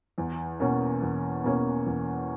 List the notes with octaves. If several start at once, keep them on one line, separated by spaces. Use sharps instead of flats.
E2
B2 A#3 C#4
E2
B2 A#3 C#4
E2